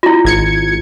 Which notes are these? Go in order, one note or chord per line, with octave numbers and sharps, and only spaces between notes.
E4 F4
G#1 G#6 C#7